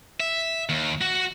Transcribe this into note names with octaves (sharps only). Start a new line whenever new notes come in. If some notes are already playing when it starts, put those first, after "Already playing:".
E5
D#2
F#4